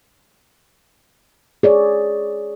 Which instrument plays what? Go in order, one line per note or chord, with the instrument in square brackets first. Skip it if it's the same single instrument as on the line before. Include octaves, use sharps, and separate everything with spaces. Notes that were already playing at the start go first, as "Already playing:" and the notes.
[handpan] G#4 C#5 D5